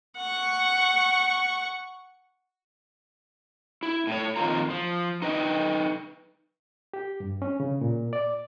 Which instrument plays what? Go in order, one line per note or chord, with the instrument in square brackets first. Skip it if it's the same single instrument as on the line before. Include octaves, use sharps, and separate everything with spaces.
[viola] F#5 C#6
[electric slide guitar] E4
A2 C#5
F2 D#3 A#3 C4 F4 A#5
F3
D#4 B4 D#5 G5
[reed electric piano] G4
G2
C#4
C#3
A#2
D5